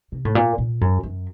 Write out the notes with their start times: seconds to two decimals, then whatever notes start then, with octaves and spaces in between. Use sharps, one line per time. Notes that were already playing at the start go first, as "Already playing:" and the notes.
0.12 C3
0.25 A2
0.35 A#2
0.58 A#2
0.81 F#2
1.03 F#2